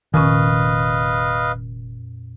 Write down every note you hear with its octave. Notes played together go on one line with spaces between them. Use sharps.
F1 F2 A#2 D#3 C#4 B4 D#5 F5